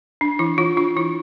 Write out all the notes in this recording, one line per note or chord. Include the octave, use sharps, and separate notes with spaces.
D4
E3 E4
E3 F4
D4 F4
E3 E4